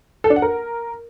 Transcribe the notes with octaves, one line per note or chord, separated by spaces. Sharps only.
A4
D4
F#5
A#4